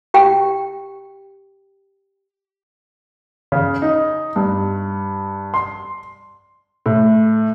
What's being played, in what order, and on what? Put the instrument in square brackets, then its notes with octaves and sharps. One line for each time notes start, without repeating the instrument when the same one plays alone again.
[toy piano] G4 G5
[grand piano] C#3
D#4
G2
C6
[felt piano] A2